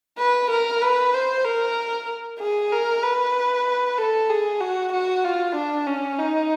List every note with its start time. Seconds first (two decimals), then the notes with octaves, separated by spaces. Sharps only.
0.18 B4
0.51 A#4
0.82 B4
1.14 C5
1.45 A#4
2.39 G#4
2.72 A#4
3.03 B4
3.98 A4
4.29 G#4
4.61 F#4
4.93 F#4
5.24 F4
5.56 D4
5.87 C#4
6.19 D#4